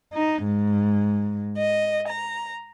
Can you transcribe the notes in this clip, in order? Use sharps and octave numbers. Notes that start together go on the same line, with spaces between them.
D#4
G#2
D#5
A#5